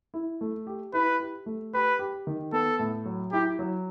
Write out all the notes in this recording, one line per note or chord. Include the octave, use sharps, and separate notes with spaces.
E4
A3
G4
E4 B4
G4
A3
G4 B4
G4
D#3
B3 A4
A2
F#3
E4 G4
F#3